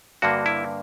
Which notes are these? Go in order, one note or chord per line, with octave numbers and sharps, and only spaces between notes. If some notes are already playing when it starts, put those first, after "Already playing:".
G2 D3 A#3 F#4
E4